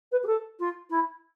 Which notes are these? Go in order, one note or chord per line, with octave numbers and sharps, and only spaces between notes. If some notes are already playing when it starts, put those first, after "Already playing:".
B4
G4
A4
F4
E4